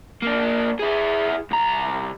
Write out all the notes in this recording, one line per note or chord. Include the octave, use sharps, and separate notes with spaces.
A#3 D4
E4 G#4
C2 A#5